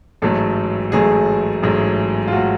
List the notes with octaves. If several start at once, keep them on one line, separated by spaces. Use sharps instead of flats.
A1 G#2 F#3 A3 A4
A1 G#2 F#3 A3 G#4
A1 G#2 F#3 A3
F4
F#3 A3 F#4